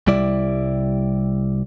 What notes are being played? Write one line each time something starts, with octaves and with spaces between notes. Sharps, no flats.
C2 G3 E4 D5